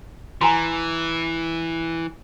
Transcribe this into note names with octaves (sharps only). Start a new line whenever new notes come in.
E3 G#5 A#5 C6